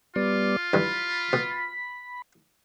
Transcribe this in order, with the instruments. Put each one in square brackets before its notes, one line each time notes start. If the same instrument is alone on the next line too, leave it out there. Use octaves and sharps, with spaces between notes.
[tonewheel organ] G3 B3 D5 [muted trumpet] F4
[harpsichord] G2 E3 [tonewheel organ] B5
[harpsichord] B2